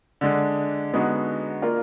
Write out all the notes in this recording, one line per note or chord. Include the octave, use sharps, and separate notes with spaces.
D3 G#3 D4
D3 G#3 B3 D#4 F#4
A#3 F4 A#4 D5